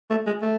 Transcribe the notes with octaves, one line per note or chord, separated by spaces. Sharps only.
A3
G#3
A3